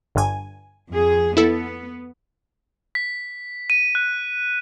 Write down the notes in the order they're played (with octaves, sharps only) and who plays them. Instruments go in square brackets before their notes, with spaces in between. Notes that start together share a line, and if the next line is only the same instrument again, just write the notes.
[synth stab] G1 G2 G#5
[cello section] F2 G#4
[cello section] B3 [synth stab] E4 A4
[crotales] B6
D#7
F#6